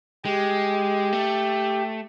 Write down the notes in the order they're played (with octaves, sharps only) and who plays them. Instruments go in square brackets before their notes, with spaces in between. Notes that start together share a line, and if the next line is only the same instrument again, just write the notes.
[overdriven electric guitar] G#3 [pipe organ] G4
[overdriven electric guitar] A3